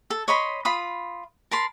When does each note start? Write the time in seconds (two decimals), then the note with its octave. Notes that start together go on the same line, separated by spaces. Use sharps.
0.10 A4
0.28 C#5 D#5 B5 C6
0.65 F4 B5 D#6
1.51 A#4 A5 B5 C6